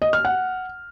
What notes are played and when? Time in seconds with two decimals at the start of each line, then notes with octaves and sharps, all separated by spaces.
0.02 D#5
0.13 F6
0.25 F#5